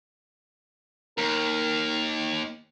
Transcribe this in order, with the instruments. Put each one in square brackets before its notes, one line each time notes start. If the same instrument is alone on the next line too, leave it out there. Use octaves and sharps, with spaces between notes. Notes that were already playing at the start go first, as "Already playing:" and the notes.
[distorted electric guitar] D#2 [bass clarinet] A#4